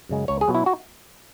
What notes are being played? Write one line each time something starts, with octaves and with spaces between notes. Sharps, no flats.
F#2 C#3 G#3
C#2 C#5
G#4
B2 F#3
E4
F#4